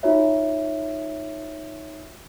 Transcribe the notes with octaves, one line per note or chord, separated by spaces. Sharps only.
D#4 F4 F#4 C#5 E5